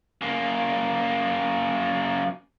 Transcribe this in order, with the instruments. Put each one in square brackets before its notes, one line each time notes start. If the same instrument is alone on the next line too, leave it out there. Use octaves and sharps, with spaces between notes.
[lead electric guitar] F#2 A#3